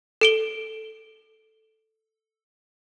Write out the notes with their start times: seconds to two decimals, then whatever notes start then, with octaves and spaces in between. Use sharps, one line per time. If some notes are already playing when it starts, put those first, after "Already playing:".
0.21 A4 D7 G7